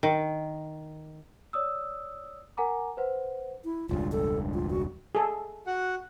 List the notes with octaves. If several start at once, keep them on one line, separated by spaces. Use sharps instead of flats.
D#3
C#5 D5 D#6 E6
A#4 F#5 G#5 A#5 D6
B4 C5 F#5
E4
E1 C#2 G2 F4
A4
F4
F#4
G#4 A4
F#4 F#5